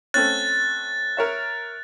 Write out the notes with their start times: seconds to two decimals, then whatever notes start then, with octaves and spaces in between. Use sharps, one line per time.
0.14 A3 C4 C#4 F#6 A6
1.17 A#4 C#5 E5